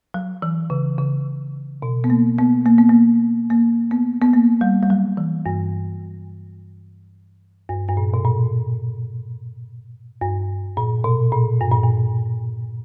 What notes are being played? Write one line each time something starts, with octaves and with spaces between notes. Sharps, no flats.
F#3
E3
C#3
C#3
B2
B3
A#3
B3
A#3
B3
A#3
A#3
B3
B3
A#3
G3
G3
F#3
E3
G2
G2
G2
A#2
B2
A#2
G2
A#2
B2
A#2
G2
A#2
G2